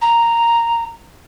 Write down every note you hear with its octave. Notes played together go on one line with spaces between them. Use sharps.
A#5